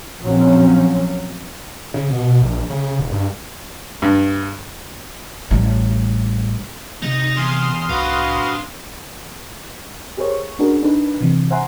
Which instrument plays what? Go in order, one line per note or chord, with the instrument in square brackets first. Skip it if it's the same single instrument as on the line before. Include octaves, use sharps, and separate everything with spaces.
[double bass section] A#1 A#2 F3 F#3 C4 C#4
[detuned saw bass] C#3
B2
B2
A#1
C#3
D#1
G2
[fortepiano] G2
[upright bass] A1 G3
[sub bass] C3 [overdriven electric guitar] D#4 D#5
[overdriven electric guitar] E2 [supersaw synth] C6 D#6 F6
[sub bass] C2 [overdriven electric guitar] D4 F5 [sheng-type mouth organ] F#4 B4
[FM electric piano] G4 G#4 A#4 C5 C#5
C#6
C#4 D4 F#4 G#4 A#4
D4 D#4 A4 B4
C3 E3
C5 E5 F#5 G#5 A#5 C6